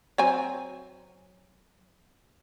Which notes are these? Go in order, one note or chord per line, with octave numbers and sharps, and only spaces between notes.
F#3 C4 G#5